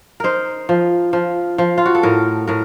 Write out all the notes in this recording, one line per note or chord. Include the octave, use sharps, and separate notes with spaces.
D#4 A#4 C5
F3
F3
F3
F4
F#4
A4
A2 A#4
A2 A#4